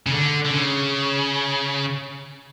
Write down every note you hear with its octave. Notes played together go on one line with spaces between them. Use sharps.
C#3
D3
D3
C#3